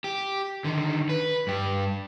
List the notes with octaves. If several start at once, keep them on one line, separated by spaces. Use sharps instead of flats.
G4
D3 D#3
B4
G2 G4